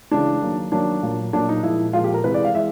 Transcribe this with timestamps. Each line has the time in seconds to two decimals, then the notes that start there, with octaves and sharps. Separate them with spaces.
0.11 C#3 E3 G#3 D4
0.42 D#3 F#3 A#3
0.72 D#3 F#3 A#3 D4
1.03 A#2 F#3 A#3
1.33 A#2 F#3 A#3 D4
1.49 D#4
1.63 A#2 F3 G#3 E4
1.93 A#2 F3 G#3 F4
2.04 G4
2.14 A#4
2.24 C3 E3 G#3 B4
2.34 D5
2.44 F5
2.54 E3 G#3 E5